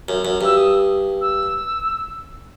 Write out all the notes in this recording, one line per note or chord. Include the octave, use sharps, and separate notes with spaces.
F#2
F#2
G2 E6
D#6
E6